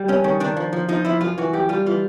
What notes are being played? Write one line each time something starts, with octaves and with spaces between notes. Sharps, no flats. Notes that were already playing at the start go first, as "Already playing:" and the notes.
Already playing: G3
G2 C#4
D#3 C#4
D#3 D4
F3
F3
F3 D#4
F3 E4
F#2 F4
E3 F#4
F#2 G4
G3 F4
E3 F4